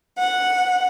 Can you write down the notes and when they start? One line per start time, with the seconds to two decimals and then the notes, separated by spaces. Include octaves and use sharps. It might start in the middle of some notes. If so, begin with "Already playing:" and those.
0.18 F#5